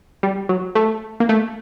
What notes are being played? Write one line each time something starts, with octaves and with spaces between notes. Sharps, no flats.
G3
F#3
A3
A#3
A3